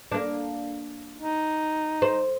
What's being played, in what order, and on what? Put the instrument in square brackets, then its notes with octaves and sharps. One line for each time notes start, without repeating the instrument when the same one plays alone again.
[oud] A#3 D4
[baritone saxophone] D#4
[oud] C5